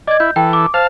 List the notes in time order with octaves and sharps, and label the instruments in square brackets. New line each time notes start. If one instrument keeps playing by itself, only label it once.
[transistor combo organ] D5 [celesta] D#5 G#6
[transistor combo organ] E4 [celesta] G6
[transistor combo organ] E3 A4 [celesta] G5
[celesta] D6
[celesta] C5 [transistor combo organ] F5 A5